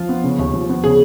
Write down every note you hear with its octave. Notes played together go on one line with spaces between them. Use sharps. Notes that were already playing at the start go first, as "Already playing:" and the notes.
Already playing: F3 F4
B3
C#3
D#2
F3
B3
C#3 G#4